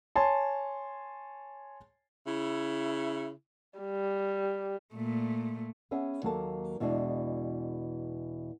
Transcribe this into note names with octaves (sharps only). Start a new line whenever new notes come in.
C#5 G#5 A5 C6
C#3 E4
G3
A#2 A3
B3 C#4 G#4 E5
D#2 F#3 A#3 A4 A5
E2 B2 E3 G#3 D4